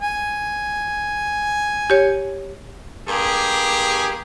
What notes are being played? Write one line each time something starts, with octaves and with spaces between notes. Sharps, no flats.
G#5
G4 C#5
G2 A#3 G4 G#4